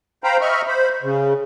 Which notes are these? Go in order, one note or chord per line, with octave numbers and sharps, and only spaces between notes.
C5 F5 G5 A#5 B5
D#5 E5 B5 C#6 F6
C5 B5
C#3